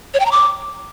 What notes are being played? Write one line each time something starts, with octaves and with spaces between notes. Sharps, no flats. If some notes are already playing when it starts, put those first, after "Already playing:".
C#5
G5
A#5
D6